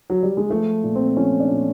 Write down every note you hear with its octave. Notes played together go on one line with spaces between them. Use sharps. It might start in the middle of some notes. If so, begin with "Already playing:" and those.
F#3
G3
G#3
F3 A3
A#2
C4
F3 C#4
D4
A#2